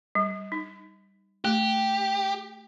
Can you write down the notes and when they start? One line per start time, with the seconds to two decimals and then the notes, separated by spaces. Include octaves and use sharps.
0.15 G3
0.52 D#4
1.45 A3 G4